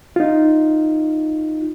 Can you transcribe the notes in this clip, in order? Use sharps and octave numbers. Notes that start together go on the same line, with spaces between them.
D#4 F4